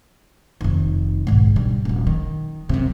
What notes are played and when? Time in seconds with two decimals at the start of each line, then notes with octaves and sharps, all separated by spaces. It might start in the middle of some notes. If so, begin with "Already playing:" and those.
0.61 F1 D#3
1.27 B1 G#2
1.56 D3 G3
1.85 D#1 F#3
2.07 D#3
2.69 F#2 C3